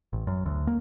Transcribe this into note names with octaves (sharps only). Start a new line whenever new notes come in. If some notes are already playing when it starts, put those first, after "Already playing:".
A1
F#2
D2
A#3